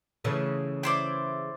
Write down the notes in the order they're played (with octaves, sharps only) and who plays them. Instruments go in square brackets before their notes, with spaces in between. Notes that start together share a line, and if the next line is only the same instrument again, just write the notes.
[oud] C#3 E3 A3
[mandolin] E4 C5 D5